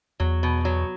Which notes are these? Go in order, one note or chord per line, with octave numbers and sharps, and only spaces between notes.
E2 F#3
B2
F#3